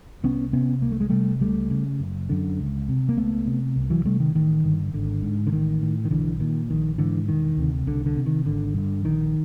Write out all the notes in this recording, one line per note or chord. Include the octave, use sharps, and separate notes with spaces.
C2 B3 C#4
C3 B3 C#4
C2 A#3
A3
G#3
C3 G3 A3
C#2 G3 A3
C#3
F#1
F#2 D3
C#2
C3
A#3
C#2 A3 B3
C3
C2
E3 F#3
C3 G3 A3
D#3
A1 D#3
G2 D3
G#1 D3
G#2
D3
A1 D#3
A2
D#3
B1 D3 E3
A#2 D#3
A#1 D#3
G#2 D3 E3
E1 D#3
D2 C3
C2 D3
D3
C3
D#3
G#1 D3
G2 D3
A#1 D#3